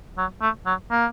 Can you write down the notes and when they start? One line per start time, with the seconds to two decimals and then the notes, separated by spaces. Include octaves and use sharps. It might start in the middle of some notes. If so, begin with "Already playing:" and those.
0.18 F#3
0.41 A3
0.66 F#3
0.91 A#3